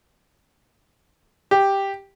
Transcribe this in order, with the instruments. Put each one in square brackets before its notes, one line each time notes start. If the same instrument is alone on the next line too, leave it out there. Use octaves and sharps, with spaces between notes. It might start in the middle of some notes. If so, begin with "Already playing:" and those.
[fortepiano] G4